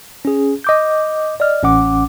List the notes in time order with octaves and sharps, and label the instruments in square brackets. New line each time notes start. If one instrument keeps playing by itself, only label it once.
[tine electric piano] C#4 G#4
D#5 D6 G6
D5 D#5 F6
A1 C#4 F#5 D6